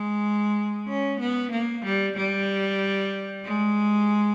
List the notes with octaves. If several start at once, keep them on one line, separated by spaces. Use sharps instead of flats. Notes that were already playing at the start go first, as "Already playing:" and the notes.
Already playing: G#3
C#4
B3
A#3
G3
G3
G#3